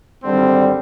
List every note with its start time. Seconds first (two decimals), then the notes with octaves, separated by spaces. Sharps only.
0.23 G#1 D3 G3 C4